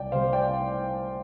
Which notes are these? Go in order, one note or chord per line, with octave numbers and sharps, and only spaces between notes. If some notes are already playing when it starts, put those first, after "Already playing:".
Already playing: C2 D5 G5
C3 G3 C5 F5
D5 G5